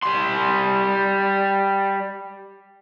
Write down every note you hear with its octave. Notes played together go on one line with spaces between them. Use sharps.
G3 C6